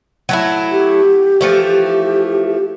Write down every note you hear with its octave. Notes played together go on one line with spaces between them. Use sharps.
F#3 A3 E4
G4
E3 F3 A3